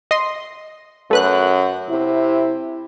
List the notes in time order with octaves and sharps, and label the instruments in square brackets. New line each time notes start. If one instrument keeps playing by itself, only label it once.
[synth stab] D#5 C6
[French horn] F#2 [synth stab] A3 B4 F#6
[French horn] C3 [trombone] E4